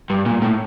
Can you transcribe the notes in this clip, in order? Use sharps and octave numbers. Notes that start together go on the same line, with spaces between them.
G2
A#2
A2